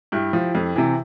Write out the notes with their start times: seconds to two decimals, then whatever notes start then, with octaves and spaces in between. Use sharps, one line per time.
0.12 G2 E4 G4
0.33 F3
0.55 F2
0.76 C3 E3